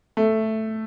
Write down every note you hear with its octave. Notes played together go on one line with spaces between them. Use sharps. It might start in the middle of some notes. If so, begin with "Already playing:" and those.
A3